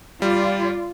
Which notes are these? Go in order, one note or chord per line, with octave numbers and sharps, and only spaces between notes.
G3 F4 D5